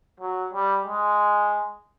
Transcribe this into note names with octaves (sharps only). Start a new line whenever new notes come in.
F#3
G3
G#3